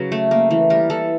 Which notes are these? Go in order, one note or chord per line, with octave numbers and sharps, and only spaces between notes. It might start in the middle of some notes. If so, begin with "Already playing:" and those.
Already playing: C#3 F#3 B4
A3
A#3
E3
G3 A#4
E3 A4